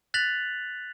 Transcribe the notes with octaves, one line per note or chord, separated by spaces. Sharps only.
F#6 A6 B6 F7 F#7